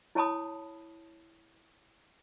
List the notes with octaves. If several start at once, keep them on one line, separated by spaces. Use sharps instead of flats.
E4 C#5 G#5 A5 B5 D#6